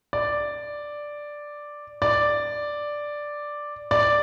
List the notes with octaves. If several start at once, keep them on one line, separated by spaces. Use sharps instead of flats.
D5
D5
D5